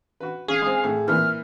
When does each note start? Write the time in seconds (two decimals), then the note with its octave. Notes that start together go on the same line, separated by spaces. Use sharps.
0.20 F#4 B4
0.48 C#4 G#4 F5
0.62 G#3 C4
0.84 A2
1.08 A#2 E3 F6